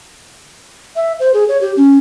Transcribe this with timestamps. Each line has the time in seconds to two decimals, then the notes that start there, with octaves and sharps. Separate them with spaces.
0.96 E5
1.20 C5
1.34 G#4
1.48 C#5
1.61 G4
1.77 C#4